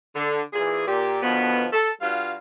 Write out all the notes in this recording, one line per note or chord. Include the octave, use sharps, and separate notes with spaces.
D3
A#2 E3 A#3 G#4
A#2 G4
B2 D3 D#3 F3 B3
A4
G2 G3 F4 F#4 F5